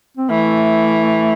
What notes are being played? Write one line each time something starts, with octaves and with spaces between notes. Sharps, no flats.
C4
E3 A3